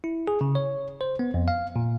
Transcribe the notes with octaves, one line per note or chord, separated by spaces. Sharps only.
E4
G#4
C#3
C#5
C5
B3
F2
F5
A#2